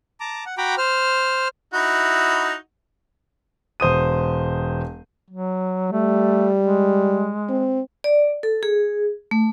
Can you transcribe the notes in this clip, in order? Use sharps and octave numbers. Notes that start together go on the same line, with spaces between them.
A5 A#5 D6
F#5
F#4 G5 A#5 B5 D6
C5 F6
D#4 E4 F#4
E1 C5 D#6 D#7
F#3
G3 A3
G#3
C4
D5
A4
G#4
A3